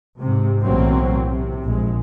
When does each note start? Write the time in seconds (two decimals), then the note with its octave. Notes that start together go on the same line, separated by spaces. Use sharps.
0.19 G#2 C3
0.62 B1 A2 E3 F#3 A#3 C4
1.29 C3
1.64 A#1 G#3